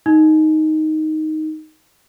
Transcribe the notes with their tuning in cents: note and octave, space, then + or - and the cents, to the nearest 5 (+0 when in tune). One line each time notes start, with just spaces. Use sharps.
D#4 +5